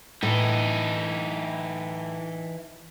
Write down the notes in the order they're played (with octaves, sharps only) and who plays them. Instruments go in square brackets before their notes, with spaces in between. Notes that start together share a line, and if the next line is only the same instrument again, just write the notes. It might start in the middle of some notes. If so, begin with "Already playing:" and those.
[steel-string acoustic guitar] A2 [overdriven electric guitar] E3 D#4